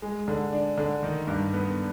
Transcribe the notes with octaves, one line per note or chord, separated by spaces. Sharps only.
G#3
D3
D4
D3
D#3
G2
B3